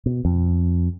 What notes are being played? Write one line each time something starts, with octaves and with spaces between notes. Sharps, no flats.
B2
F2